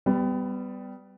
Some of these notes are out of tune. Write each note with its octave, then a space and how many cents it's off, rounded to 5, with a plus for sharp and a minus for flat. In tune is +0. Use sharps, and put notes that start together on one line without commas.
G3 -5 B3 +25